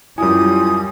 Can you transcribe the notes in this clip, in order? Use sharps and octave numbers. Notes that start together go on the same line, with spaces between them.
F#2 G3 E4 F4 G#5 D#6